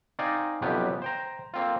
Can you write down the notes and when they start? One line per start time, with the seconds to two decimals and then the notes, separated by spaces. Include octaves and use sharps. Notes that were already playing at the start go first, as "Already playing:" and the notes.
0.19 C4 D#4 D5 F5 G#5 A#5
0.62 B1 F2 C3 B3 C#4 G4
1.02 C5 G5 A#5
1.54 A#3 C4 F4